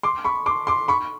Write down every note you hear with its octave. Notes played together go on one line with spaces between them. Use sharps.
C6 D6
B5 C#6
C6 D6
C6 D6
B5 C#6